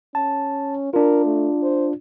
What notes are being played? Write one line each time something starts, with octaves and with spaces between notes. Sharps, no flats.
C#4 A5
D4 F4 A#4
A3
C5